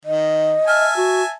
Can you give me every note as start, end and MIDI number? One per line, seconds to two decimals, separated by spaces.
0.05 0.54 51
0.05 0.86 75
0.67 1.33 76
0.67 1.33 80
0.67 1.33 81
0.67 0.95 89
0.96 1.22 66